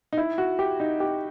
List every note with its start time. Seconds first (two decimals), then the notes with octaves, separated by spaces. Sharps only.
0.13 D#4
0.18 E4
0.38 F#4
0.59 G4
0.80 D#4
1.00 G4